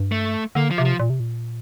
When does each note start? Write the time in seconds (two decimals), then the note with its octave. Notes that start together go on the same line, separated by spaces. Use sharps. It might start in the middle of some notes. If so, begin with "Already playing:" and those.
Already playing: G2
0.12 A3
0.55 D3 A#3
0.71 F3
0.78 C3
0.85 F3
1.00 A#2
1.10 C3
1.20 A#2